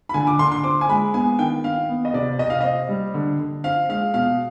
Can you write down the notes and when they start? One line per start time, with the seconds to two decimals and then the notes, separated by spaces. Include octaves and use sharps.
0.09 B5
0.14 D3 G#5
0.27 D6
0.39 D3 C6
0.52 C6
0.64 C4 D6
0.81 G#5
0.89 G#3 B5
1.14 B3 G#5
1.39 D#3 G5
1.64 D#3 F5
1.89 B3
2.05 D#5
2.13 C3 D5
2.39 C3 D#5
2.50 F5
2.61 C4 D#5
2.89 G3
3.14 D3
3.40 D3
3.64 C4 F5
3.89 G#3 F5
4.14 B2 F5